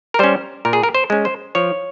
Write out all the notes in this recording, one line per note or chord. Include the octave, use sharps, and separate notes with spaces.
A#4
G3 C#4 C5
A#2 A#4
G#4
A#4
C5
G#3 C#4
C5
F3 C#5